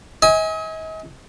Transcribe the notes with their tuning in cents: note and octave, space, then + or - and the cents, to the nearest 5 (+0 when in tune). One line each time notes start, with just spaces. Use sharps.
D#5 +40 G#5 -10